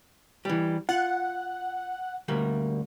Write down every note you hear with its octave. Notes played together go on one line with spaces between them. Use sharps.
E3 G3
F4 F#5
D2 G3 A#3